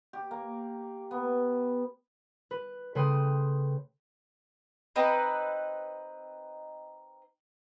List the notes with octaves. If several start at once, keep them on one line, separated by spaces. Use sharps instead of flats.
G4
A#3
B3
B4
C#3 A3 B4 G5 C6 D#6
C4 D#4 B4